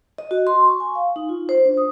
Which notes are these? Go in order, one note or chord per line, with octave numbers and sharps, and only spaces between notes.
D#5
F#4
C6
C#6
G#5
F5
D#4
F4
C5
D4
D#6